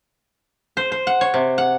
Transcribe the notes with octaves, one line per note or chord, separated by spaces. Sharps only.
C5
C5
F#5
C#5
C3
F#5